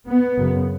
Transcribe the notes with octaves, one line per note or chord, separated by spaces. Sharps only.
B3
F#2 C#3